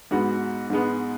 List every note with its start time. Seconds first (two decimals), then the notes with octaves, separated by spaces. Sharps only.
0.11 G#2 G#3 B3 F#4
0.70 G#2 G#3 B3